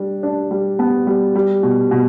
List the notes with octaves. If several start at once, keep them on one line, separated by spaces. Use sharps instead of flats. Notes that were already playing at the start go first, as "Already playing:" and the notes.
Already playing: G3 D4
D4
G3
B3
G3
G3
B2
B2